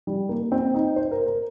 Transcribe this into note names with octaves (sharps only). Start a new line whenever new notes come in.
G3
A#3
C4
D#4
C5
A#4
A#4